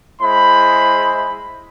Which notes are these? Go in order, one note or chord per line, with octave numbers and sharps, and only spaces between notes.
G#3 E4 C5 B5